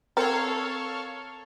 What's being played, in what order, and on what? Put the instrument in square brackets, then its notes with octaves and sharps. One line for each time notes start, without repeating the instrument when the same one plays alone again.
[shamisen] C4 A#4 [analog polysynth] A4 C#5 F5